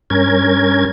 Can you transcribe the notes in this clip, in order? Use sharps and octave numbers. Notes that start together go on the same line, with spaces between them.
G2 C#4 A#4 G#6